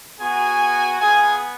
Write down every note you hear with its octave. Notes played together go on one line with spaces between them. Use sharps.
B3 F#4 G#4 G#5
B3 F4 G#4 G#5